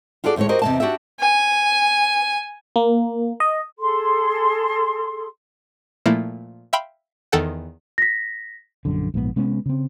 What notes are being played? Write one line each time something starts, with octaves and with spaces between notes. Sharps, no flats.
F4 F#4 G#4 A4 D5
D2 A2 E3 G#3 C#5
F#4 G4 A#4 C5 D#5
E2 C3 A3 A#3 D#5 A5
D4 F#4 G4 D5 E5
G#5
A#3
D#5
G#4 A4 C6
A#2 F3 A3 A#3 E4
E5 F5 G5 B5 C6
E2 D#3 A4 F#5 G5
A#6 B6
A#1 F#2 D3
A#1 G#2 B2 B3
C3 G#3 B3 C#4
C#3 C4